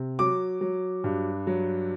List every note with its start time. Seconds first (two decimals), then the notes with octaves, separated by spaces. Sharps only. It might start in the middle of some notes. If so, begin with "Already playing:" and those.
Already playing: C3
0.19 F#3 D6
0.61 F#3
1.04 G2
1.47 F#3